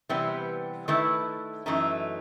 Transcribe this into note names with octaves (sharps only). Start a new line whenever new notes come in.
C3 E3 G3 B3
D#3 A3 E4 B4
F#2 E3 A3 D#4